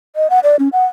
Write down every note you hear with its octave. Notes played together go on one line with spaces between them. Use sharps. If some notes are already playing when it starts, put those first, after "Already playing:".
D#5
F#5
D5
C#4
F#5